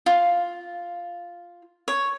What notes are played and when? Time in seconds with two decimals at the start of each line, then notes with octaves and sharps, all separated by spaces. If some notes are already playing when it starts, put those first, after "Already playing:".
0.06 F4
1.88 C#5